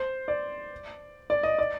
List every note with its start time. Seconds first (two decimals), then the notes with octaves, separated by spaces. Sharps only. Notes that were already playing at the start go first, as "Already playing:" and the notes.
Already playing: C5
0.28 D5
1.30 D5
1.43 D#5
1.58 D5